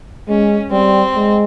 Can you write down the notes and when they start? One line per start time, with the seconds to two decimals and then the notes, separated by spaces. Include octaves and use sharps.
0.28 G#3 C#4
0.72 G3 C4
1.16 G#3